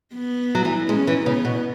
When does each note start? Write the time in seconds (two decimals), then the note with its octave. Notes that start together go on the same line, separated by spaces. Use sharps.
0.15 B3
0.55 F#3
0.65 E3
0.89 G#3 C#4
1.07 E3
1.26 C#3 B3
1.45 B2